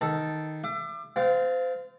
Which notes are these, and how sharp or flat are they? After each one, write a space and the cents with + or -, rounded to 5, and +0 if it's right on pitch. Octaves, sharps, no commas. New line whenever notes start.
D#3 +0 A4 +0 A5 +0
E5 +35 D6 +30
C4 -30 F4 +0